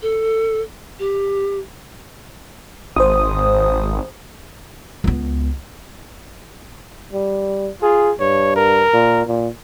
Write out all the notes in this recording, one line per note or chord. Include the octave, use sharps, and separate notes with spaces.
A4
G4
G#1 C5 D#6
C#2 B3
G3
F4 G#4
G2 C#5
A#4
A#2
A#2